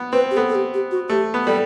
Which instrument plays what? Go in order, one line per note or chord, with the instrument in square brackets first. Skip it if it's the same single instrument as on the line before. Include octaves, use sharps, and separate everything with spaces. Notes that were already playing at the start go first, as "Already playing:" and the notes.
Already playing: [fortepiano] B3
[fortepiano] C4 [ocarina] B4
[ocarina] G4
[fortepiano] B3 [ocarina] A4
[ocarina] A4
G4
G4
F#4
[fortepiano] A3 [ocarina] G4
[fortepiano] B3
[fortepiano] G3 [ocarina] A4